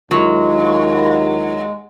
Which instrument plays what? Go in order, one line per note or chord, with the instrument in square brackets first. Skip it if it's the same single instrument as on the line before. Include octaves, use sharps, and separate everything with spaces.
[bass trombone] D#2 [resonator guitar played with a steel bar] F#3 [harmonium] G#3 [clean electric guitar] E4 F4 A#4